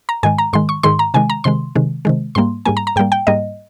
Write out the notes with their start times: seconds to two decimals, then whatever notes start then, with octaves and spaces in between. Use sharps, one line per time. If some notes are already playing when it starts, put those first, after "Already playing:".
0.09 A#5
0.23 G#2 D#3 G#3 G#5
0.38 A#5
0.53 G#2 D#3 G#3 C6
0.69 C#6
0.83 G#2 D#3 G#3 C6
0.99 A#5
1.14 C3 D#3 G#3 G#5
1.30 A#5
1.44 C3 D#3 G#3 C6
1.75 C3 D#3 G#3
2.05 C3 D#3 G#3
2.35 G#2 G3 A#3 C6
2.65 G#2 G3 A#3 G#5
2.77 A#5
2.87 A#5
2.96 G#2 G3 A#3 G5
3.12 G5
3.27 G#2 G3 A#3 D#5